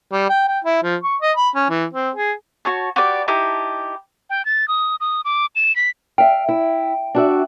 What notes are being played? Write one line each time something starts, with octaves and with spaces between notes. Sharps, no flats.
G3
G5
G5
E4
F3
C#6
D#5
B5
C#4
E3
C4
G#4
F#4 C#5 A5
F#4 G4 B4 D5
D#4 E4 G4 A5
G5
A6
D#6
D#6
D6
E7
B6
E5 F5 G5
E4
D4 F#4 E5